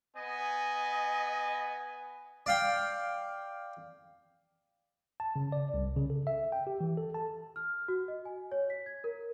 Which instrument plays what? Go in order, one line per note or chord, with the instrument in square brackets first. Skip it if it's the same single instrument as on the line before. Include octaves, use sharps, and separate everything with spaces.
[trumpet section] B3 G#5 [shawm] D#5
[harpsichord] D5 F5 G5
[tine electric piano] A5
C#3
D5
C2
C#3
A4
E5
G5
G4
E3
A4
A5
[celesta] F6
F#4
D#5
G#5
C#5
B6
G#6
A#4